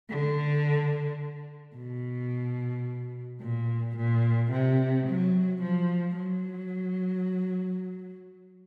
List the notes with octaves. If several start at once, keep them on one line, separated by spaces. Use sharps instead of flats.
D3
B2
A#2
A#2
C3
F#3
F3
F#3